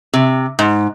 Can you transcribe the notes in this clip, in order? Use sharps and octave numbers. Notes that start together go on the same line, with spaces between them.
C3
G#2